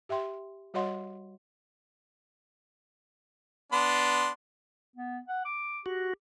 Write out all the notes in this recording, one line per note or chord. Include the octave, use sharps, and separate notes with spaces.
G4 E5 G5 C6
G3 F#4 C#5 D#5 F#5 C6
B3 D4 C6
B3
F#5
D6
F#4 G4